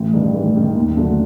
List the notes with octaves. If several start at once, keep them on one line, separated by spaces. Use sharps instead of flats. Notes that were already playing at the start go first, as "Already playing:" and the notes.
Already playing: A1
G2 D#3
A1
G2 D#3
D#2
D3 F#3 A3